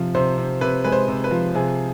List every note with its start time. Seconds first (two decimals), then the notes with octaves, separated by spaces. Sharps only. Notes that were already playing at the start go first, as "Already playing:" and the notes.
Already playing: C3 F3
0.15 C3 C5
0.38 C3
0.61 C3 B4
0.84 G#3 B4
0.92 C5
1.08 C3
1.24 B4
1.31 F3
1.55 C3 G#4